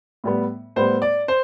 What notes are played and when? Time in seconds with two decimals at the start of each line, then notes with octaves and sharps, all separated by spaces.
0.24 A2 G3 B3
0.76 A2 G3 B3 C5
1.02 D5
1.28 C5